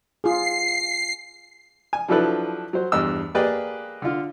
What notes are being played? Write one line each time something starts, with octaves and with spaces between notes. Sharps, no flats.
F4 G#4 C7
G#5
F3 F#3 D4 E4 A4 B4
F#3 C5
E2 G2 D#5 E6
A#3 G4 G#4 B4 D5 D#5
D3 F4